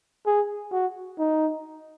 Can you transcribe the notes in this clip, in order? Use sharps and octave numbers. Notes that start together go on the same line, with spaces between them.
G#4
F#4
D#4